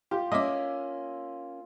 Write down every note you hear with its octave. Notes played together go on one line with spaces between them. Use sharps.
F4 G4
A#3 C#4 D#5 E5 D6